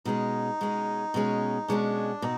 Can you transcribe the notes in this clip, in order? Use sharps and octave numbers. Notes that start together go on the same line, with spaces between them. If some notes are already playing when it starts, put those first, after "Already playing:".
B2 G#3 C#4 D#4
B2 G#3 C#4
B2 G#3 C#4
B2 G#3 C#4 D4
B2 C4 D#4